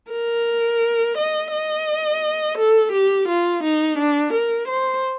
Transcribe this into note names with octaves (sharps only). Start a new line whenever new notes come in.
A#4
D#5
D#5
A4
G4
F4
D#4
D4
A#4
C5